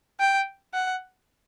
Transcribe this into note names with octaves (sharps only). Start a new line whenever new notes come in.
G5
F#5